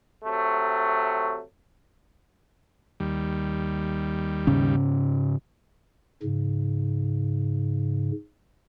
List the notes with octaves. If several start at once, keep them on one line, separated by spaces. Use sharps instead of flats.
C3 F#3 A3
D#2 G3
G#2 C#3 C#4
G#2 C#3